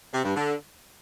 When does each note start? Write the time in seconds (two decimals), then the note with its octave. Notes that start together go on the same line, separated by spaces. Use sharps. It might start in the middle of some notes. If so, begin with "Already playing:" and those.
0.13 C3
0.24 G2
0.35 D3